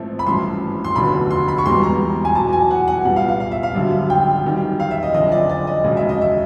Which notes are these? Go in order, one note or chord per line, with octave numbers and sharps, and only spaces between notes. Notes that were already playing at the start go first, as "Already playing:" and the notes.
Already playing: A1 G#2 F3 A3 C4
B5
G#1 G2 E3 A3 C#4 C6
C6
F1 D#2 D3 F#3 B3 B5
C6
B5
C#6
E1 E2 B2 G3 B3 C6
A#5
G#5
E2 B2 F#3 A5
G#5
F#5
F#5
C2 A#2 G3 B3 F#5
F5
F5
F5
E5
F5
G#1 F#2 D3 G3
G5
F#2 D#3 G3
F5
E5
D#5
F#1 F2 D3 D#5
D5
D5
D#5
E1 D#2 C#3 F#3 D#5
E5
D#5
E5